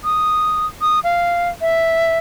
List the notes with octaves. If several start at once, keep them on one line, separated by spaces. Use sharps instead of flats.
D#6
D#6
F5
E5